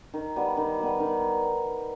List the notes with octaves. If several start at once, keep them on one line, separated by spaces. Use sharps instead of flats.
D#3
G3 B3
D#3
G3 B3
D#3